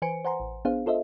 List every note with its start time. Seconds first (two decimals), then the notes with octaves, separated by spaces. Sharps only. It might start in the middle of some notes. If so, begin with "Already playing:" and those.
0.02 E3 B4 C5 G#5 C#7 D7
0.25 C5 F#5 G#5 A#5 C6
0.40 A1
0.65 B3 D4 G#4 C5 F5
0.86 F4 A4 C5 D#5 E5